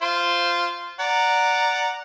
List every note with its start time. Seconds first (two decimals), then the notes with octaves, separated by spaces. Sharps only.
0.02 F4 C5
1.00 D5 F#5 A#5